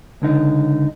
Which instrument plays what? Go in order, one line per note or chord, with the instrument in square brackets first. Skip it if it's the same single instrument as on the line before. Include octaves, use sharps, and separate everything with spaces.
[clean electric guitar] C#2 D3 D#4